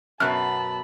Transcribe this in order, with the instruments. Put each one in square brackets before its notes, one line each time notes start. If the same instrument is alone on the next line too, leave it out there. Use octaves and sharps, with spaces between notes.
[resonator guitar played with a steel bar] F#2 B2 B3 [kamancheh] A5 B5 [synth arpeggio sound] F6 F#6